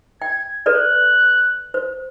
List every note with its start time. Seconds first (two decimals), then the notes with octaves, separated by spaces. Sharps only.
0.22 G5 G#6
0.66 A4 B4 D5 F#6
1.74 C5